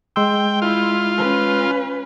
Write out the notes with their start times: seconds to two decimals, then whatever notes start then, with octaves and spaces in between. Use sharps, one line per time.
0.16 G#3 G5 C6 E6
0.62 E4 F4
1.17 C#4 B4